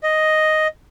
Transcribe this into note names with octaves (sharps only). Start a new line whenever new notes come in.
D#5